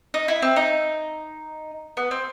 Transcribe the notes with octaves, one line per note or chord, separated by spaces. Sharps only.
D#4
E4
C4
D#4
B3
C4